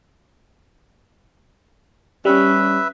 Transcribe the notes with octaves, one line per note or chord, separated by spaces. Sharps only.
G3 C#4 B4 E5